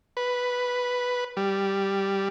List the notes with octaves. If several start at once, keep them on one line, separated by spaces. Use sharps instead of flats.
B4
G3